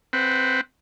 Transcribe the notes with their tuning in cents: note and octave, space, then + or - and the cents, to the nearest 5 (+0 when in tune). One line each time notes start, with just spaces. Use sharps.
C4 +0 B4 +10 F#5 -15